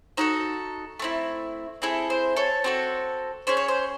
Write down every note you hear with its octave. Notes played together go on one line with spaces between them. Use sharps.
D#4 F#4 A4 C5
A3 C4 E4
C4 E4 G#4 A4
C5
A4 C#5
C4 F#4 A4
C#4 G#4 C5
C#5
C5